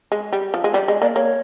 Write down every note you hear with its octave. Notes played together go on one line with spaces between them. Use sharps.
G#3
G3
F3
G#3
G3 D5
G#3 D#5
A#3 D5
A#3 C#5